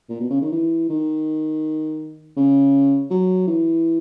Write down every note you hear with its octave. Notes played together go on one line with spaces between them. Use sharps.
A#2
B2
C#3
D#3
E3
D#3
C#3
F#3
E3